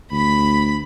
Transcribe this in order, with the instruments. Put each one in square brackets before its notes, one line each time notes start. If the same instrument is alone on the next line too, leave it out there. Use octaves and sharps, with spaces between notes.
[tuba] D2 [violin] B5 B6